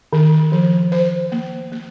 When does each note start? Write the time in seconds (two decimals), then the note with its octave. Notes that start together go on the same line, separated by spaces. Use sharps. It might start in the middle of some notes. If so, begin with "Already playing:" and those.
0.13 D#3
0.52 F3
0.92 C5
1.32 A#3
1.72 A#3